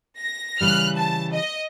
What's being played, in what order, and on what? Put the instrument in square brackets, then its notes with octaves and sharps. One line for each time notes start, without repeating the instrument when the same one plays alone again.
[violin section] A#6
[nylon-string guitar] C#3 E3 G3 [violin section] F6 F#6
[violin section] A5
D#5